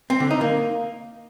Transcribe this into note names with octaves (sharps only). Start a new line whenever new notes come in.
C4
D3
D#4
A#3